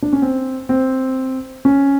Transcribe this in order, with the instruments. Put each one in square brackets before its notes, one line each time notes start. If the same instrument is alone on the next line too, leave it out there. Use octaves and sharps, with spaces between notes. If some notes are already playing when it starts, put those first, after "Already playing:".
[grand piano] D4
C#4
C4
C4
C#4